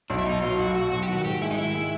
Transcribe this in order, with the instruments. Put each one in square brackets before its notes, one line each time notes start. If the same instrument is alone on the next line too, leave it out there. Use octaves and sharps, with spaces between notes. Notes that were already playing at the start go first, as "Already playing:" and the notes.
[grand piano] B1 [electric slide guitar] D4
[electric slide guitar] E4
[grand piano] B2 [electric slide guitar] D#4
[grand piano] F#3 [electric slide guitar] F4
[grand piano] B1 [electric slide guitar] F#4
[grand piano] F#3 [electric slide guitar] F#4
[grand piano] B1 [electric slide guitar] F#4
[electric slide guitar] G4
[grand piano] D#3 [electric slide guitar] F#4
[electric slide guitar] F#4
[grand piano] G#2 [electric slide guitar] G4
[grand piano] G#3 [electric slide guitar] E4
[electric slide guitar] D#4
[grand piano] D#3 [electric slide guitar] E4
[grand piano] G#3